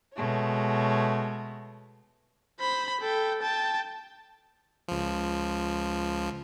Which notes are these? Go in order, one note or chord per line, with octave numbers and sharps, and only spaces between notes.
B2 G#3 A3 C#5
C5 B5
A4 G5
G5 A5
C#2 F3